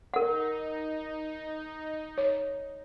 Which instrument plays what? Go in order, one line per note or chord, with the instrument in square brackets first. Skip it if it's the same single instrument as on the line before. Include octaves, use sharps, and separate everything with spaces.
[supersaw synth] D#4 [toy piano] A#4 F#5
[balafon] C#5